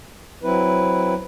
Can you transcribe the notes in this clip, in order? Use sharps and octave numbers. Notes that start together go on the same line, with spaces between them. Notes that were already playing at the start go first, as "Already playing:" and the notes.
F#3 C4 E4 B4